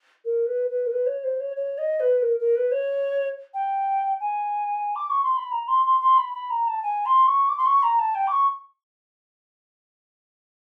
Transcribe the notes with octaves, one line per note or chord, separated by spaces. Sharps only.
A#4
B4
B4
A#4
B4
C#5
C5
C#5
C#5
D#5
B4
A#4
A#4
B4
C#5
G5
G#5
D6
C#6
C6
B5
A#5
C6
C6
C6
B5
B5
A#5
A5
G#5
C6
C#6
D6
C6
C#6
A#5
A5
G5
D6
C#6